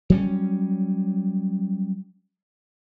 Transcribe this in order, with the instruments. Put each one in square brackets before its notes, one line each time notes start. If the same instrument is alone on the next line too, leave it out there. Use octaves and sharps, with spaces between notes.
[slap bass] F#3 G3 C#4